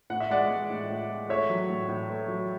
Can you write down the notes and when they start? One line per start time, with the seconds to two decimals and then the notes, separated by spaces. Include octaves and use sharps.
0.10 A2 F#5
0.20 E5
0.30 G#3 D5 F#5
0.51 G#3
0.70 A2
0.89 A2
1.10 G#3
1.29 A3 C#5 E5
1.50 F#3
1.69 A2
1.89 A2
2.10 A3
2.28 F#3